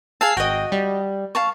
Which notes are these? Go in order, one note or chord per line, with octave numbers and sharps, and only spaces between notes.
G#4 F5 A5 E6 C7
G#1 F#4 D#5 G5
G3
F5 A5 C#6